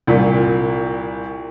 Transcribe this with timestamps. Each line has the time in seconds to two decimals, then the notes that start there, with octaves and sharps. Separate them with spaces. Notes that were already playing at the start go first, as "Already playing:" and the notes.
0.07 C2 A#2